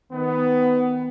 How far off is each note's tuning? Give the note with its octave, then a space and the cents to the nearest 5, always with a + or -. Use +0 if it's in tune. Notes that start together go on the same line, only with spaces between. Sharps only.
D#3 +20 B3 +20